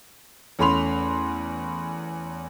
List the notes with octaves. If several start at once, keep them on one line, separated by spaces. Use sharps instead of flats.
E2 A3 C#4 B5 C6 F7